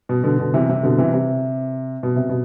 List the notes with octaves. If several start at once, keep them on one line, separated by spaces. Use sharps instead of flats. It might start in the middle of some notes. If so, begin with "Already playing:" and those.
B2
B2 D3
B2 D3
C3 E3
C3
B2 D3
C3 E3
C3
B2
C3
B2